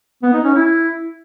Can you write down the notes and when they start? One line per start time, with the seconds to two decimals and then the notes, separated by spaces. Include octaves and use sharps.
0.23 B3
0.33 D#4
0.44 C#4
0.54 E4